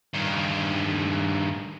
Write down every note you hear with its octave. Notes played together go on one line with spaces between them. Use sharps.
G2 D#3